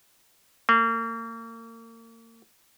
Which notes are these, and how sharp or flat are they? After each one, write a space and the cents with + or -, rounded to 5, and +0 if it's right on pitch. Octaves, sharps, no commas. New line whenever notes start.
A#3 -35